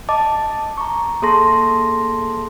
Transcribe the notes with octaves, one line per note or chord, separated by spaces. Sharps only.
D#5 A5 D6
A#5 C#6
A#3 G#4 A4 A5 C6 A#6